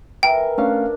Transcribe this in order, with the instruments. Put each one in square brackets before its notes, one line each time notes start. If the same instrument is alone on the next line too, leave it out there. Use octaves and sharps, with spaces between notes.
[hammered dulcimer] E3 A#4 E5 [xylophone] G5
[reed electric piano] A3 C#4 F5 [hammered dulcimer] D4